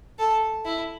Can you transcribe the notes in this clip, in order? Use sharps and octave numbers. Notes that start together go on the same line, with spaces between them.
A4
E4